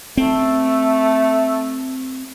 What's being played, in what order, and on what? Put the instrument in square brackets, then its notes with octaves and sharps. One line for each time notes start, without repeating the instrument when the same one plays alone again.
[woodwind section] A3 [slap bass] C4